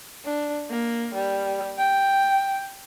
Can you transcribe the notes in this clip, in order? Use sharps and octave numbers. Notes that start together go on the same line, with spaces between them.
D4
A#3
G3
G5